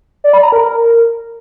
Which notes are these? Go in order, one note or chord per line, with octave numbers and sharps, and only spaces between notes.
D5
B5
A#5
A#4